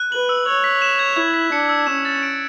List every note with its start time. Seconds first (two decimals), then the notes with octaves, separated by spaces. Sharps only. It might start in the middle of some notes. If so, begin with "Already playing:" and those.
Already playing: F#6
0.11 B4 F#7
0.29 E6
0.46 C#5 E6
0.64 B6
0.82 E7
0.99 G#6
1.16 E4 G#6
1.34 B6
1.52 D4 C#7
1.69 E6
1.87 C#4 E7
2.05 A6
2.23 D7